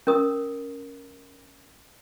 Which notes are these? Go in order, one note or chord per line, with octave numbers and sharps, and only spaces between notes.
C#4 A#4 D#6